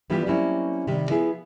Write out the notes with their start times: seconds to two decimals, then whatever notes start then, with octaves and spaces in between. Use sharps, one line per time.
0.10 E3 G3 B3 D4 F4 G4
0.26 F#3 G3 A#3 C4 C#4 E4
0.87 C3 D#3 G3
1.10 F3 B3 E4 G#4